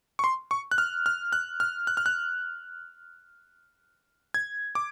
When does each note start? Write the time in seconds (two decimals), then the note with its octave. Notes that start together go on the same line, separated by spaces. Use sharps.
0.19 C#6
0.24 C6
0.51 C#6
0.71 F#6
0.78 F6
1.06 F6
1.33 F#6
1.60 F6
1.87 F#6
1.97 F6
2.06 F#6
4.34 G#6
4.75 D6